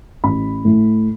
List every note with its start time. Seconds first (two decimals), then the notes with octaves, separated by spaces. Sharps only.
0.24 A1 B5
0.65 A2 A3